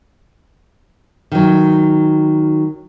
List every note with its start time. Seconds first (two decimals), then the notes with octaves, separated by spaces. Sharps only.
1.32 D#3 F#3